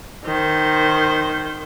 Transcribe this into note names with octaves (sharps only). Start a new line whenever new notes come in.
D#3 C5